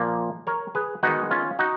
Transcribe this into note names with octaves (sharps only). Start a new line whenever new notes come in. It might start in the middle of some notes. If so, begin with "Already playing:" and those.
Already playing: A#2 F3 A#3
A#4 C#5
G#4 B4
D#3 G#3 B3 D#4 F#4
C#4 F4
D#4 F#4